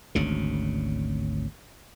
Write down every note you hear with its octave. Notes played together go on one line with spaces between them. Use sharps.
G#1 D2 C#3